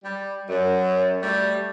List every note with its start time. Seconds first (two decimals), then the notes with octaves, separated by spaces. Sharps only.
0.04 G3
0.49 F#2
1.22 G3 A3